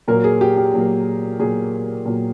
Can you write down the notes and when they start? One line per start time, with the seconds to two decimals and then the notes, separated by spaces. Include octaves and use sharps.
0.08 A#2 F#3 A#3 A#4
0.24 G#4
0.41 G4
0.57 G4
0.74 A#2 F#3 A#3
1.40 A#2 F#3 A#3 G#4
2.06 A#2 F#3 A#3